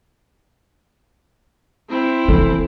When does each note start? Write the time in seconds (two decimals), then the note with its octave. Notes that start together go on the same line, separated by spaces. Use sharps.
1.89 C4 E4
2.28 E3 A4